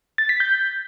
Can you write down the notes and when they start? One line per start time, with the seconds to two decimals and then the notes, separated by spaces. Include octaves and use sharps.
0.18 A6
0.29 B6
0.40 G6